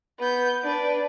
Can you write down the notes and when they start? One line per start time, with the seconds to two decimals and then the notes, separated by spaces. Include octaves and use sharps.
0.19 B3 G6
0.63 D4 B4